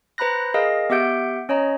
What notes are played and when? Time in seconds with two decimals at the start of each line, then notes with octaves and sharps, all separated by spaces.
0.18 B4 C5 A#5 B5 F#6 A#6
0.54 G#4 A#4 D#5 F5 A#6
0.90 B3 G4 E5 F#5 G6 D7
1.49 C#4 C#5 D#5 A#5